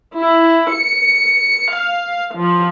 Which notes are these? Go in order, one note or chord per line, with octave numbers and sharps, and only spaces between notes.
E4
C#7
F5
F3